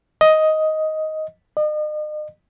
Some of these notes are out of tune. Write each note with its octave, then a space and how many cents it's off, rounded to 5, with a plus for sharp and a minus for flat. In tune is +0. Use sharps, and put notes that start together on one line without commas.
D#5 +10
D#5 -40